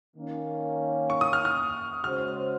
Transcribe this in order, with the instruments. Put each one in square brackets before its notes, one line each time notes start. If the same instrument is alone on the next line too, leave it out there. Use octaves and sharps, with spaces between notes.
[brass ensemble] D#3 A#3 C#4
[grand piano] C#6
D#6
F6
F6
[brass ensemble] C#3 G#3 C#4 F#4 C5 [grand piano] F6